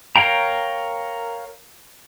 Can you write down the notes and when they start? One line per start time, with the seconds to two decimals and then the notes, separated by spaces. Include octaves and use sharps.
0.16 A#4 C#5 F5 G5 A#5